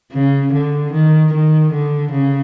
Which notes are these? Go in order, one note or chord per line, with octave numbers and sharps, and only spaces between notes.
C#3
D3
D#3
D#3
D3
C#3